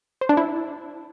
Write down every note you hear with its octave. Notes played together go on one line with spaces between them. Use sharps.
C5
D4
E4